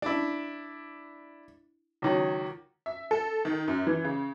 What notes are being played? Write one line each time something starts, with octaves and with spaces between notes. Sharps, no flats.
D4 E4
C#2 D#3 F#3
E5
A4
D#3
F#2
E3
C#3